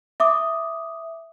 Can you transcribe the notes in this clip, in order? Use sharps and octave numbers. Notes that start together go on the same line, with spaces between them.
E5 D6 D#6